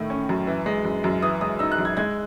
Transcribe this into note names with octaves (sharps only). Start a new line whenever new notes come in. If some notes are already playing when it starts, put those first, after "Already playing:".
Already playing: A2 D#3 A3
C#4
F#2
E3
G#3
F#2
F#2
E3 D#6
G#3 D#6
D#4 E6
F#6
F#2
G#6
G#3 G#6